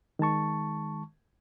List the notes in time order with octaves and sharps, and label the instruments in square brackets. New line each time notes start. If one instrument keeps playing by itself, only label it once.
[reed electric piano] D#3 G#3 A5 C#6